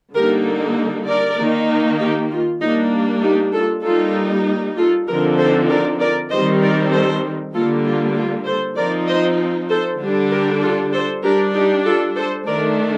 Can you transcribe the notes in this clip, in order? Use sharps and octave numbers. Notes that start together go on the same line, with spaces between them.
D3 G3 A#3 D#4 G4 A#4
A#4 D5
D#3 A#3 D#4
D#4 G4
F4
G3 A#3 D4 D#4
D#4 G4
F4 A4
G3 A#3 D#4 F4 A4
F4 A4
D3 F3 C4 D#4 G4 A#4
A4 C5
A#4 D5
A#4 D5
D#3 G3 C4 D#4 C5 D#5
A#4 D5
A4 C5
D3 G3 A#3 F4 A4
F4
F4
A4 C5
F3 C4 D#4 A#4 D5
C5 D#5
A4 C5
D3 G3 D4
G4 A#4
F4 A4
A4 C5
G3 D4 G4 A#4
D#4 G4
F4 A4
A4 C5
D#3 A3 D4 A#4 D5